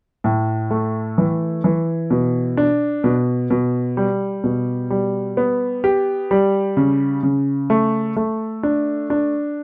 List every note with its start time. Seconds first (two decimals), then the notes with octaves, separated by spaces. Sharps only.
0.24 A2
0.70 A3
1.18 E3
1.64 E3
2.10 B2
2.57 D4
3.04 B2
3.50 B2
3.97 G3
4.44 B2
4.90 G3
5.37 B3
5.84 G4
6.31 G3
6.77 C#3
7.23 C#3
7.70 A3
8.16 A3
8.63 D4
9.10 D4